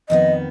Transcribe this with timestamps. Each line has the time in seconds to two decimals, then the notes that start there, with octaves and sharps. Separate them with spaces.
0.09 F2 D#3 B3 D#5